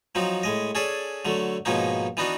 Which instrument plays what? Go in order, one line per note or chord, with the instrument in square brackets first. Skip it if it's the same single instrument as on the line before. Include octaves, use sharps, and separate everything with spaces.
[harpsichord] F3 F#3 C4 D#4
A2 G#3 D#5
C#4 G#4 A4 D5
D3 F#3 A3
G#2 B2 F3 A#3 C#4 D#4
E3 B3 D4 D#4 F#4